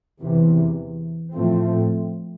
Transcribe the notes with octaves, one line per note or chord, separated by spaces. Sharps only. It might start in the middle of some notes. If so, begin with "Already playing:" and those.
E2 C3 E3
A2 F3 A3 C4